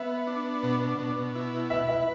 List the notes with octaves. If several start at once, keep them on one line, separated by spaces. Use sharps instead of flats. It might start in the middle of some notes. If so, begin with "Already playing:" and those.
Already playing: B3 E5
D4
B2
B2
E4
B4 E5
E5